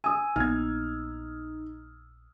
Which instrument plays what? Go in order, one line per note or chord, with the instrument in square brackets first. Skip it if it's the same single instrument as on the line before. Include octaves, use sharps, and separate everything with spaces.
[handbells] G#5 [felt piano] D#6 E6
[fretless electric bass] A#1 B3 [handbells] D#4 [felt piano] F6 G#6